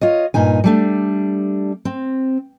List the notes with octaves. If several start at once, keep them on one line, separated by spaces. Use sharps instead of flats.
F4 C#5 D#5
G2 A#2 D#4 G#5
G3 A3 D4
C4